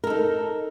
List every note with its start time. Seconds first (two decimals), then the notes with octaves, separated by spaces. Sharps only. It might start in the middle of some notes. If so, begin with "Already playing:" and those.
0.04 A#4
0.07 A4
0.10 D#4